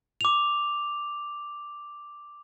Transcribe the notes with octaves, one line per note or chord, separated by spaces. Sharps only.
D6 F7